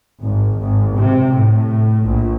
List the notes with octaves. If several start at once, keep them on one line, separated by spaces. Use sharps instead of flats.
G#1
G#1
C3
A2
A#1